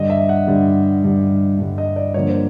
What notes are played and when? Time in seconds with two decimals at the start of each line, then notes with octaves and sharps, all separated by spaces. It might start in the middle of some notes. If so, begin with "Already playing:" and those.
Already playing: G2 D3 G3 D#5
0.10 E5
0.29 F#5
0.47 G2 D3 G3
1.04 G2 D3 G3
1.59 G2 D3 G3
1.78 D#5
1.96 D5
2.14 G2 D3 F3 A#3 C#5
2.29 C5